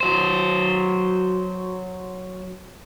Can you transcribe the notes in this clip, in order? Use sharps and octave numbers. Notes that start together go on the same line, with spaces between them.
F#3 C5